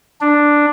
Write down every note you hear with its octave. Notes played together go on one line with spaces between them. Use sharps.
D4